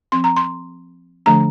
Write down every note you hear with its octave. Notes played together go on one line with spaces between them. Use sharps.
F3 C4 C6
A#5
C6
D3 F3 A3 D4 A#5